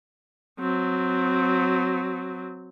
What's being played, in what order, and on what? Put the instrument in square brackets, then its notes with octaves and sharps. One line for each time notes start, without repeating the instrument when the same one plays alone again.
[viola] F#3 C4